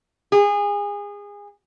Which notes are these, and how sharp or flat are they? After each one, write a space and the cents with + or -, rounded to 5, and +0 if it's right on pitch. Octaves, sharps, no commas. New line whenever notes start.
G#4 -25